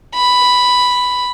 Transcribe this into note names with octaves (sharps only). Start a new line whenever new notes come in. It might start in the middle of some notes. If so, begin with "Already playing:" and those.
B5